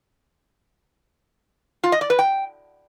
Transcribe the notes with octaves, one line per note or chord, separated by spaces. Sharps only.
F4
D#5
D5
B4
G5